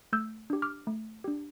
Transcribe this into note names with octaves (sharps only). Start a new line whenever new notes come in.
A3 E6 G6
D4 G4
D6 F6
A3
D4 G4